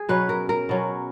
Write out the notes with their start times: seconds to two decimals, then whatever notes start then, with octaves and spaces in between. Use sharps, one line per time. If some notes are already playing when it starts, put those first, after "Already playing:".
Already playing: G#4
0.09 B2 F#3 C#4 B4
0.29 A#4
0.49 A#4
0.69 B2 F#3 C#4